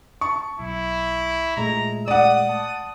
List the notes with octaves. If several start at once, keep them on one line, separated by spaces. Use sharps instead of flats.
A5 C#6
B1 E4
A#2 G#3 A3 A#5
D5 F#5 D#6
A5